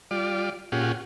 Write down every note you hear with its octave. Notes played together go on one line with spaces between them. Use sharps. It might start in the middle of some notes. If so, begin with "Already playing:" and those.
G3 F4 D5
A#2 C#4 F4 G4 G#4 F#5